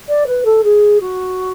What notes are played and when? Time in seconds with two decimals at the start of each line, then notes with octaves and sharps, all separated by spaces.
0.09 D5
0.27 B4
0.45 A4
0.64 G#4
1.00 F#4